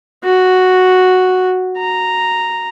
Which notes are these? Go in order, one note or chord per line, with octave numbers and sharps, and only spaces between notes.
F#4
A#5